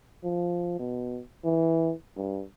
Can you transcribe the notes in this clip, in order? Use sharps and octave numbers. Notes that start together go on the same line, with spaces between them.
F3
B2
E3
G2